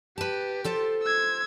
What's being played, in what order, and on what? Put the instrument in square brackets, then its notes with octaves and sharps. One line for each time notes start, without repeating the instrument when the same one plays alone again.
[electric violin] G4 [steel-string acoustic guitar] B4 A5
[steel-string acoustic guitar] F4 A4 C5
[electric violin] E6 G#6